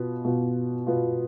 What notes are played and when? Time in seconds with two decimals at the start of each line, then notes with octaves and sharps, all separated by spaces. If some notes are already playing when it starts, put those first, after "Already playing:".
Already playing: B2 B3 F4
0.24 B2 B3 F4
0.87 B2 B3 F4